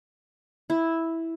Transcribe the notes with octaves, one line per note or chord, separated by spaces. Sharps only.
E4